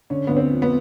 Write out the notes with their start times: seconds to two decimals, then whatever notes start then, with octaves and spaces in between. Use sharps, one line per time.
0.10 D3 C#4
0.27 D2 B3
0.37 C4
0.50 F3
0.62 B3